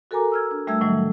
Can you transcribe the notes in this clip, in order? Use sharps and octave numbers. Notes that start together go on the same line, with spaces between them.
F#4 A4 A#4 G#5 A#5 D6
E6 F6 G#6
D4
G3 A3 E5 E6 G#6
A2 D#3 E3 F#3 G3